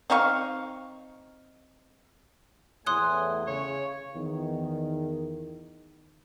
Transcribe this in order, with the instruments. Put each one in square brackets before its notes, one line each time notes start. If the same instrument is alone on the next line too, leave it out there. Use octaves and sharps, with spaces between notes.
[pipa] C4 D#4 F5 C#6
[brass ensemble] E2 A2 [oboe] G#5 [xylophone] C6 D#6 F#6
[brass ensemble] C#3 [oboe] C#5
[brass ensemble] E2 D#3